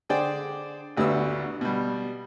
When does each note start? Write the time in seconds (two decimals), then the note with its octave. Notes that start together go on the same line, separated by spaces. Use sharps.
0.09 D3 G#4 C5 D5 G5
0.97 A1 D2 D3 B3 E6
1.61 B2 G3